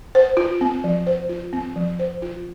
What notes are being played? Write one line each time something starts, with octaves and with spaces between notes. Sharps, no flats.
C5
F4
C4
F3
C5
F4
C4
F3
C5
F4